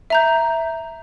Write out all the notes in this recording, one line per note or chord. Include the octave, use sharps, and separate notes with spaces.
E5 A#5 G6